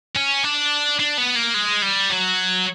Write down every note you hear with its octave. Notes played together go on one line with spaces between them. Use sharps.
C#4
D4
D4
B3
A#3
G#3
G3
F#3